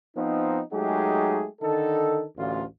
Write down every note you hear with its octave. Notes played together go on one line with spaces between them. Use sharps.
F3 B3 C4 D#4
F#3 G#3 A3 D#4 G4 G#4
D3 D#3 D#4 A4
A1 D2 F4